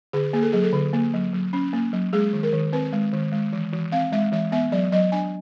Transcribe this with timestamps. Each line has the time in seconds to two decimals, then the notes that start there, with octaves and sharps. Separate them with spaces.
0.13 D3 G#4
0.33 A#3 G#4
0.43 A4
0.52 F#3 G#4
0.63 A4
0.73 D3
0.93 A#3
1.13 F#3
1.33 F#3
1.53 C#4
1.73 A#3
1.93 F#3
2.13 G#3 G#4
2.33 D#3
2.43 A#4
2.53 D#3
2.73 C4 B4
2.93 G#3
3.13 D#3
3.33 G#3
3.53 E3
3.73 E3
3.92 C4 F5
4.12 G#3 E5
4.32 E3 E5
4.52 B3 E5
4.72 F#3 D5
4.92 F#3 D#5
5.12 D4 G#5